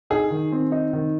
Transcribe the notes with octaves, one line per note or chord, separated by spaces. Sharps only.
D#4 G#4
D#3
C4
D#4
D#3